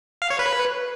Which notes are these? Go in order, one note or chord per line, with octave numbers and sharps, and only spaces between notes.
F5
C#5
B4